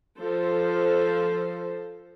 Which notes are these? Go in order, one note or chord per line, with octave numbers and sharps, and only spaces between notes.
F3 A4 C5